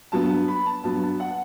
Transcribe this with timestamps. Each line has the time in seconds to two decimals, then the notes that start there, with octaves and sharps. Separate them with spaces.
0.12 G2 F#3 B3 A5
0.48 B5
0.66 A5
0.84 G2 F#3 B3 A5
1.02 A5
1.20 F#5